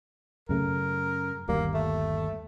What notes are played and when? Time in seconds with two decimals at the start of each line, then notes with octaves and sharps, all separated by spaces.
0.49 F#2 C#3 A3 A#4
1.49 G1 D#2 G3 A#3
1.74 A3